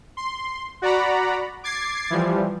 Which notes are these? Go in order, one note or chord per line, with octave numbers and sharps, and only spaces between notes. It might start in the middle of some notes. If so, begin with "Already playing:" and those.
C6
F#4 D5 F#5 A#5 B5
D6 G#6 A6 C7
E3 F3 G3